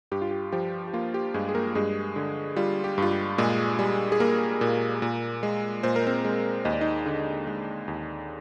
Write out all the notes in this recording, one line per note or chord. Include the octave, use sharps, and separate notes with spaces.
G2 G4
F4
G4
F3 G4
G4
A#3 F4
G4
G2 G#3 G#4
G#4
A#3 A#4
G2 G#3 G#4
D3
G3 F4
G4
G2 F4
G4
A#2 G#3 G#4
G3
G#4
A#3 A#4
A#2
A#2
G#3
A#2 C5
A#4
C4 C5
G#3
D#2 D#5
D5
D#4 D#5
D3
G#3
D#2